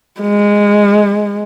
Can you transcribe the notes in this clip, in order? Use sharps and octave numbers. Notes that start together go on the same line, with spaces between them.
G#3